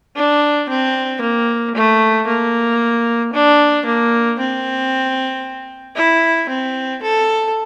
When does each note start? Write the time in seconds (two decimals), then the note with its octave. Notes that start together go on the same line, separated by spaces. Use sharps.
0.16 D4
0.69 C4
1.21 A#3
1.75 A3
2.27 A#3
3.33 D4
3.86 A#3
4.39 C4
5.96 E4
6.49 C4
7.02 A4